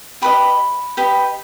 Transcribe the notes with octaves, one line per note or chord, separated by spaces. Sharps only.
G4 B4 D#5 B5
G4 B4 D#5